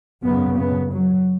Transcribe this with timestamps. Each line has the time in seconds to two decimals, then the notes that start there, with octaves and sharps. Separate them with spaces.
0.24 F#2 C#3 B3
0.58 B3
0.92 F#3